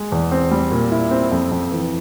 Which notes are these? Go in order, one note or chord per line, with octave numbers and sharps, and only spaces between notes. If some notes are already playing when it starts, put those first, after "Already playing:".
Already playing: G#3
E2
C4
G3
A#2
E4
C4
F2
F2
E3